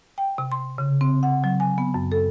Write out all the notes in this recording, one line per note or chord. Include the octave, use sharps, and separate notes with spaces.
G5
C3
C6
C#3
C4
F#5
F#3
G#5
B3
F#2
A4